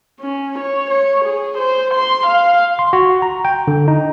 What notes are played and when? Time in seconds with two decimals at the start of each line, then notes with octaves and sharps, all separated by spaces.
0.20 C#4
0.59 C#5
0.90 C#5
1.25 G#4
1.58 C5
1.95 C6
2.27 F5
2.79 C6
2.93 F#4
3.22 A#5
3.45 G5
3.68 D3
3.88 D#4